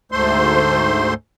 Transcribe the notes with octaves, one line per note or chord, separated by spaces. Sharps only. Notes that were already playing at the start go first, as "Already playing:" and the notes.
D2 G#2 A3 C5 C6